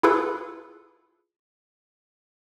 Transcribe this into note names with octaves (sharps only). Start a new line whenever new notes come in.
E4 F4 G#4 A4 B4